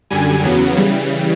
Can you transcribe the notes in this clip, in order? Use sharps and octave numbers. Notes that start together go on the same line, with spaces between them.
F#2 D3 G3 G#5
E2 C#3 F#3 B3
C#3 E3 G3